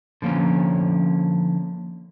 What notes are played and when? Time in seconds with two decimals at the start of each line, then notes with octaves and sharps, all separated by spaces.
0.22 D3 F3 A#3 C#4